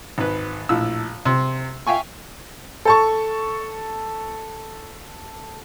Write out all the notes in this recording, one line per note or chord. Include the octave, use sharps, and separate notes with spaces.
G#1 B4
A#1 A2 E6
C3
E5 F5 G5 G#5 C#6
A4 A5 C#6